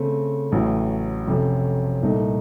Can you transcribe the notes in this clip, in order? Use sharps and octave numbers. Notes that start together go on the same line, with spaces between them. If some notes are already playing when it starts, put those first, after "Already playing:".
Already playing: C#3 A3 C4
A1 A2 F#3
F2 C3 F#3 A3 C#4
C2 A#2 A3 D#4